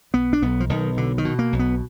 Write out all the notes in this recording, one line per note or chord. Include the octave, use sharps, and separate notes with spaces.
B1 B3
D4
B1 B3
F3
B1 D#3
B2 D3
D#3
B2
A#3
B1
B3